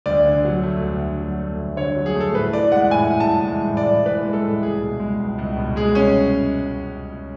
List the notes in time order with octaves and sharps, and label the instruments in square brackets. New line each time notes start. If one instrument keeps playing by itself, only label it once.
[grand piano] D2 D5
D3
F#3
A3
D2
D3
F#3
A3
D2
D3 C#5
F#3
G#4
A3
A4
A2 B4
E3 D5
G#3 F#5
A2 G#5
A2
A5
E3
G#3
A2
D5
A2
E3 B4
G#3
A4
A2
C#2 G#4
B2
G#3
C#2
C#2
B2
G#3 G#4
C#4